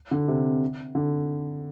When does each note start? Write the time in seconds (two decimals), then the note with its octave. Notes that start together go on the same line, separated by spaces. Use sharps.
0.11 D3
0.28 C3
0.95 D3